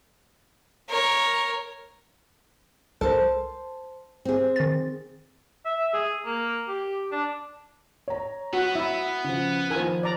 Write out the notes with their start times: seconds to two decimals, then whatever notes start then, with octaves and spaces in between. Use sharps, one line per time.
0.89 A#4 C#5
3.01 C2 A4 A#4 C5 A5
4.25 C4 G#4
4.56 D#3 A6
5.65 E5
5.93 G#4
6.25 A#3
6.68 G4
7.11 D4
8.08 C#5 A#5
8.53 B3 F#4
8.75 E4 E5
9.24 C#3 F3
9.70 D#3 F3 A#4 G#5
10.03 D5 A#5